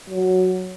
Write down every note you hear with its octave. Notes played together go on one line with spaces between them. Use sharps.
F#3